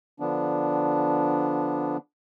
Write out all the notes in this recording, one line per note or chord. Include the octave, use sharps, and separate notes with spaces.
D3 F3 B3 D4